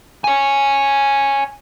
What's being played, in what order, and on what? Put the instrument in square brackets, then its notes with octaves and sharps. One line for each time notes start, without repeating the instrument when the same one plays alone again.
[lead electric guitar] C#5 G#5